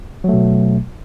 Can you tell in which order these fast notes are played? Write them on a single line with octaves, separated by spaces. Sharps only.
F#3 A3 B2